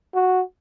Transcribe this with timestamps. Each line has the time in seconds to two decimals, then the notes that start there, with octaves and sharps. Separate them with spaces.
0.15 F#4